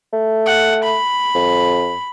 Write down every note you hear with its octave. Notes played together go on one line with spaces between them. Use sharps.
A3
F#5
B5
F2